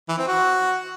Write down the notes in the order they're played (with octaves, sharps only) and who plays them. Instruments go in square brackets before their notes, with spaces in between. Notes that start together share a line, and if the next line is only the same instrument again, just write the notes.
[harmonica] E3
C4
F#4